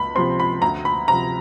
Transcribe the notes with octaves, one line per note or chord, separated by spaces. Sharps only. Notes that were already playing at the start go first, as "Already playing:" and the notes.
Already playing: C#2 B5
C3 F3 C6
B5
D2 A#5
B5
C3 F3 A#5